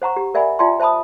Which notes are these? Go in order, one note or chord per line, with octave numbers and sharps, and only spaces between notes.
C5 F#5 A#5 C#6
G4
A#4 D5 E5 F#5 G#5 B5
F4 D5 E5 G5 A5 C6
C5 E5 A5 B5 D#6